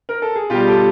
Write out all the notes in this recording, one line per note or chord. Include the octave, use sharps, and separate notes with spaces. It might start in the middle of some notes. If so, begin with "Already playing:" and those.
A#4
A4
G#4
B2 G3 F4 G4
G4 A4